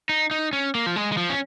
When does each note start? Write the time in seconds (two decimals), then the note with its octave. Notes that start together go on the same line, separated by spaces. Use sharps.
0.09 D#4
0.31 D#4
0.53 C#4
0.75 A#3
0.86 F3
0.96 G#3
1.12 G#3
1.17 F3
1.30 C#4